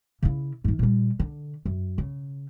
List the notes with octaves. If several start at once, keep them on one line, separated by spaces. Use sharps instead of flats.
C#3 E4
G#2 D#3
A#2 G3
D3
F#2
C#3